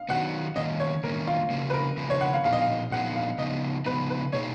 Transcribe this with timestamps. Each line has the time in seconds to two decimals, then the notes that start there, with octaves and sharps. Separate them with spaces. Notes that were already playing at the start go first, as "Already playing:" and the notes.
Already playing: F5
0.09 D#3 F#3 B3 F#5
0.56 F#2 D#3 A#3 C#4 D#5
0.80 C#5
1.03 F#2 D#3 A#3 C#4 A#4
1.27 F4
1.50 C#3 F3 A#3
1.70 B4
1.74 A#4
1.97 C#3 F3 A#3
2.10 C#5
2.21 F#5
2.34 F5
2.45 A#2 F3 B3 D#4 G#4 F5
2.53 D#5
2.61 F5
2.91 A#2 F3 B3 D#4 G#4 F#5
3.16 F5
3.38 C#3 F3 B3 D#4 D#5
3.86 C#3 F3 B3 D#4 B4
4.10 B4
4.33 B2 A#3 D#4 G#4 C#5